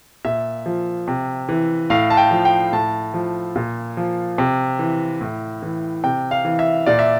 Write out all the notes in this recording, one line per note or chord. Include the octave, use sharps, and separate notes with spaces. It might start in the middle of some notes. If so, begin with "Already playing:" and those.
A#2 E5
F3
C3
E3
A2 F5
A5
G5
F3
G5
A2 A5
F3
A#2
F3
C3
E3
A2
E3
C3 G5
F5
E3
E5
A#2 D5
E5